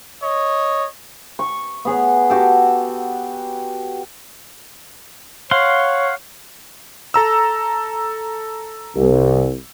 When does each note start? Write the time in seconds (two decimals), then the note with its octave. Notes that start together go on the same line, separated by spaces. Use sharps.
0.22 C#5 D#5
1.39 C#6
1.85 B3 G#4 C#5
2.30 F#4 G4 A4
5.51 C#5 F5 F#5 C6
7.14 A4 A#5 E6
8.96 C2